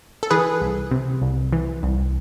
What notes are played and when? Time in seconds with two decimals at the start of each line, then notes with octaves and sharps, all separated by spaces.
0.23 A4
0.30 E3 G#4 B4
0.61 C2
0.91 C3
1.22 C2
1.53 E3
1.83 C2